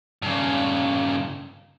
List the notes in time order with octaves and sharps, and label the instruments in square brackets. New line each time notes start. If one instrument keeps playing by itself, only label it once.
[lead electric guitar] G2 C#3